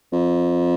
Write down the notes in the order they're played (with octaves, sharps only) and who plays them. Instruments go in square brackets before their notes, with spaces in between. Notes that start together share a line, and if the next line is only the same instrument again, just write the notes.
[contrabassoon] F2